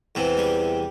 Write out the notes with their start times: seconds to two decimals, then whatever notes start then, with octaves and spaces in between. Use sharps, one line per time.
0.15 E2 C3 E3
0.37 G3